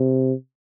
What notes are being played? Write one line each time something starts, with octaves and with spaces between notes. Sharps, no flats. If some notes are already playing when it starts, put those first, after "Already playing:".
Already playing: C3